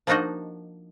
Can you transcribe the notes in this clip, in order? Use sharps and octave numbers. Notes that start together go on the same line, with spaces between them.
F3 A#3 D4 D#4 F#4 D#5